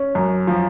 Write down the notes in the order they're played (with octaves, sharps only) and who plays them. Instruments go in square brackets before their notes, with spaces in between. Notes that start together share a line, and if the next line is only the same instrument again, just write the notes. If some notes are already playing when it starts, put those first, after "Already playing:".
Already playing: [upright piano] C#4
F#2
F3